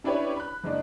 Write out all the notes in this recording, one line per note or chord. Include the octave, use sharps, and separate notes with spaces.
C#4 D4 E4 G4 B4 C#5
B5 F#6
F#1 G#3 D4